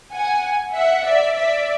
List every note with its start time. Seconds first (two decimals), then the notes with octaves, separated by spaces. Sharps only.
0.12 F#5 G#5
0.73 E5 F#5
1.04 D5 E5
1.35 D5 E5